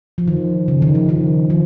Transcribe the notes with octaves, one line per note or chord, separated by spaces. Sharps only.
F3
D#3
C#3
D#3
F3
D#3
F3